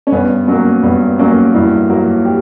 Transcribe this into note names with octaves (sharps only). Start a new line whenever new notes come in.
C#4
G2 B3
F#3 A#3 C#4
G2 B3
F#3 A#3 C#4
G2 E4
F#3 A#3 F#4
G4